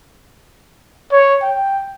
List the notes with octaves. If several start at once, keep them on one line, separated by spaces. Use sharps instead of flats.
C#5
G5